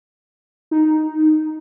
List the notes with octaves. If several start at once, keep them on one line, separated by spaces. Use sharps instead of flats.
D#4